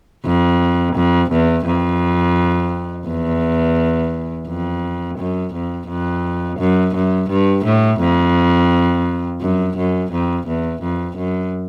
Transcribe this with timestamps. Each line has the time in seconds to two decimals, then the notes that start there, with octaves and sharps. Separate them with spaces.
0.25 F2
0.96 F2
1.31 E2
1.66 F2
3.07 E2
4.47 F2
5.18 F#2
5.54 F2
5.89 F2
6.59 F#2
6.95 F#2
7.30 G2
7.65 A2
8.00 F2
9.41 F#2
9.77 F#2
10.12 F2
10.47 E2
10.82 F2
11.17 F#2